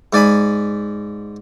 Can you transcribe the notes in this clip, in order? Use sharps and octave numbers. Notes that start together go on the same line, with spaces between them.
G#2 D5 G#5 B5